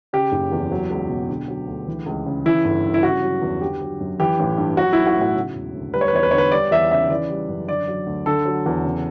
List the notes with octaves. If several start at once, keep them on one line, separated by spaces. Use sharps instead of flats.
C#3 G4
F#1
E2
F#3
C#2
B2
D3
F#3
D2
E3
C#2
C#3
E3 E4
G1
G2
E4
C#3 F#4
F#3
E2
D3 G4
F#3
F#2
E3 G4
A1
G2
F#3 F#4
B1 E4
F#4
A2 F#4
C#3
E1
D2
G3 B4
C#5
B4
E2 C#5
B4
D3 C#5
B4
G3 D5
E2 E5
C#3 E5
E3 D5
G3
F#2
D3 D5
F#3
D2
D3 A4
F#3
E2
C#3